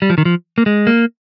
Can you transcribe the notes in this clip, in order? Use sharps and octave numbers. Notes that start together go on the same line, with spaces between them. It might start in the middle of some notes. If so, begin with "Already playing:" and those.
G3
F3
D#3
F3
A#3
G#3
A#3